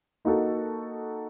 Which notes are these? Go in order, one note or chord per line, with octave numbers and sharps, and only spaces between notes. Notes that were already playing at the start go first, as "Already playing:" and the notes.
A#3 D#4 F#4 A4